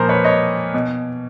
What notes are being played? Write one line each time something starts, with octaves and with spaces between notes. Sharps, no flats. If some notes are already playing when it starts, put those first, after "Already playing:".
Already playing: A#2 F3 A#4 C5
B4 C#5
C#5 D#5
B2